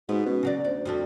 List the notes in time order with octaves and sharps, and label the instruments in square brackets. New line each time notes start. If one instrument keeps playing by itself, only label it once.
[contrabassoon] G#2 [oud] B3 [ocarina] F#4
[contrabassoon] B2 [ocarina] C#4
[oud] C#3 F#3 D5
[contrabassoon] D2 [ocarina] C5 [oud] D5
[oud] F2 G3 A4 [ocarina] F#4